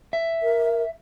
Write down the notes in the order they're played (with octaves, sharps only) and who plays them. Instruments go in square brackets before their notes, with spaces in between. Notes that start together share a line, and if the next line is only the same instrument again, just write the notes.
[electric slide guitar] E5
[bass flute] A#4